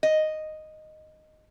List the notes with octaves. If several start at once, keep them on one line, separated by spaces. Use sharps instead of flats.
D#5